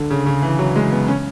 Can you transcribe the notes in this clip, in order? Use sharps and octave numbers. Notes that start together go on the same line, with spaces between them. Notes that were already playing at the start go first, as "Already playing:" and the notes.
Already playing: D3
C#3
C#3
E3
F#3
G#3
B3
C#4